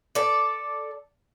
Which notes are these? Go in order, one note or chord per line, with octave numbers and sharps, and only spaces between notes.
A4 D5